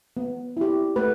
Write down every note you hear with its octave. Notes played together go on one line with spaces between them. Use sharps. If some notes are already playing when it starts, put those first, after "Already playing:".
B3
E4 G4
A3 B4